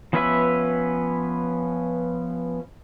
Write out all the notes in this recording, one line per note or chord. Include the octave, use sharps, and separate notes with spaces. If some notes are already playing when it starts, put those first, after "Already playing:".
F3 B3 C#4 B4 E5